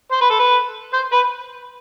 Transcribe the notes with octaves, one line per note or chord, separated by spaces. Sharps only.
C5
B4
A4
B4
C5
B4